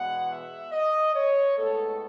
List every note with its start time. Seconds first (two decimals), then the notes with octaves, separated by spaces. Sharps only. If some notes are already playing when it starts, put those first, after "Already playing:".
Already playing: E2 B2 G#3 B3 F#5
0.30 E5
0.72 D#5
1.14 C#5
1.57 A2 G#3 B3 A4